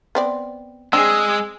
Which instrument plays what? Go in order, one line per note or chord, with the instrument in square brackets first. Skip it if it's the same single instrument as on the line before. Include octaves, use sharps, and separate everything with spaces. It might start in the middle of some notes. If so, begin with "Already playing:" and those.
[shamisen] B3 C4 D5
[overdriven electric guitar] G#3 [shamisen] C4 D4 [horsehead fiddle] G#4 [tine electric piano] E6